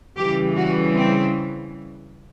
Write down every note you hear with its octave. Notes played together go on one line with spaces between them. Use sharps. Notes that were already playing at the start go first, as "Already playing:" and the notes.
C#3 E3 G3 G4
F#4
C4